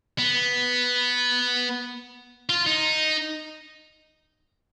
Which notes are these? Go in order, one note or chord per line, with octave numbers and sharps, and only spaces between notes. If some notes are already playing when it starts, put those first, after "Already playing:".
B3
F4
D#4